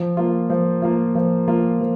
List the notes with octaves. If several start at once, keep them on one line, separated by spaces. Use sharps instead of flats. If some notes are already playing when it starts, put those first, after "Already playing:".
Already playing: F3
A#3 F4
F3
A#3 F4
F3
A#3 F4
F3